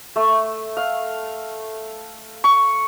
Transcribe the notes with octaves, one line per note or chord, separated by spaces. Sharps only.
A3
F5
C#6